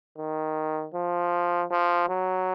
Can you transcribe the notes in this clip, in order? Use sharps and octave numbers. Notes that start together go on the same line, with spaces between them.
D#3
F3
F3
F#3